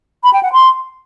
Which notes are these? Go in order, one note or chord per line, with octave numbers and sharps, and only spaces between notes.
B5
G5
F#5
C6